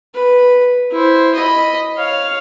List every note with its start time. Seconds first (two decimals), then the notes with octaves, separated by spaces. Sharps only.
0.15 B4
0.92 E4 C5
1.35 D#5 B5
1.97 C#5 F5